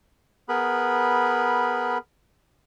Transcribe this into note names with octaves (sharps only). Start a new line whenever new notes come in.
B3 G#4 A#4 B4 B5